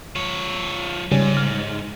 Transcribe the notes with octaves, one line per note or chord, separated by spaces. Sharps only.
F3 C#5
G#2 C#3 G3 C#4
F6